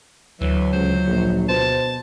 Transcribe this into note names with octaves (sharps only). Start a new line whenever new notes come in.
D2 E3 F#3
C#2 C5
A#1
B2 C5 A5